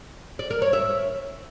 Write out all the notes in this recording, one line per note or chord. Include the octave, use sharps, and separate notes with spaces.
D5
A#4
C#5
E5